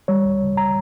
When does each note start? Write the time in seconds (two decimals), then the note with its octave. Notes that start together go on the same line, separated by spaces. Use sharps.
0.08 G3 C#5
0.24 C#2
0.41 C#3
0.57 A#5